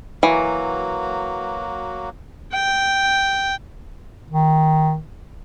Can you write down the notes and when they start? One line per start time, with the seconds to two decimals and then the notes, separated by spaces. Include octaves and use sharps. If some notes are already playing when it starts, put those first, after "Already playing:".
0.23 E3 F#3 A#3 F#4
2.53 G5
4.31 D#3